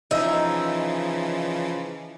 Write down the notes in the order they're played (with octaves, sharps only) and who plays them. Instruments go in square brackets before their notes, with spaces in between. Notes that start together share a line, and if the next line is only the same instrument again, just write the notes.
[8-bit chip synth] C#3 E3 F3 [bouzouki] D#4 E5